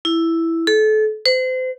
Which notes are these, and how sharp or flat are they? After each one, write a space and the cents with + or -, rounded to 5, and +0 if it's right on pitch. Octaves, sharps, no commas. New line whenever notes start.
E4 +0
A4 -30
C5 -35